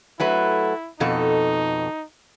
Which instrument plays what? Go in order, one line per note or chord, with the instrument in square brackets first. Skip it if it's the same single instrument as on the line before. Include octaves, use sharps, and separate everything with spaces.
[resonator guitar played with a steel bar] F#3 A3 B4 [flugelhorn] E4
[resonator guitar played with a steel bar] F2 B2 A4 [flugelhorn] D#4